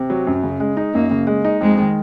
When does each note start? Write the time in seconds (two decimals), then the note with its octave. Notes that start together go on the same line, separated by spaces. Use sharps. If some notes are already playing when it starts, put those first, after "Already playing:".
Already playing: C3
0.10 F#3
0.27 F#2
0.43 C#3
0.60 G#3
0.77 D#4
0.94 F#2 A#3
1.11 C#3
1.27 G#3
1.44 D#4
1.61 F2 G#3
1.78 D#3